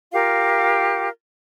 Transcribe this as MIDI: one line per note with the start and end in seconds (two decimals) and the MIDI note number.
0.13 1.09 65
0.13 1.09 67
0.13 1.09 70
0.13 1.09 77